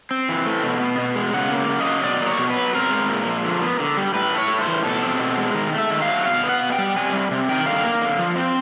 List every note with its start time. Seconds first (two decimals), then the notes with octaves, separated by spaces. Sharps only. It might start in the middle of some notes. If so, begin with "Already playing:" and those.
0.11 C4
0.29 E3
0.46 A3
0.63 B2
0.81 B3
0.98 B2
1.16 G#3
1.33 C#3 F#5
1.51 A#3
1.68 C#3
1.80 D#5
1.87 F#3
2.04 B2 D5
2.21 A#3
2.27 C#5
2.39 B2
2.50 B4
2.56 F#3
2.75 C4 A#4
2.91 G#3
3.09 A#2
3.27 F3
3.44 D3
3.62 B3
3.80 D3
3.97 G3
4.14 A2 B4
4.33 A3
4.38 C#5
4.50 A2
4.61 C5
4.67 E3
4.84 B2 A4
5.03 C4
5.19 B2
5.37 G#3
5.55 D#3 A#4
5.73 A3
5.78 E5
5.90 D#3
6.02 F5
6.08 F#3
6.26 B2 F5
6.44 B3
6.49 F#5
6.61 B2
6.72 G5
6.79 G3
6.96 C3 G#5
7.13 G3
7.31 C3
7.49 D#3 G5
7.66 D3 F5
7.84 A#3
8.01 D3
8.19 F3
8.36 C4